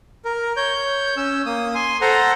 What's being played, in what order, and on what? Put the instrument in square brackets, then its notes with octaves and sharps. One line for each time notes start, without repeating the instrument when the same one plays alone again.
[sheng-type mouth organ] A#4
C#5 G6
C#4 E6
A#3 D#6
G#5 C6
A4 C5 F#5 A#5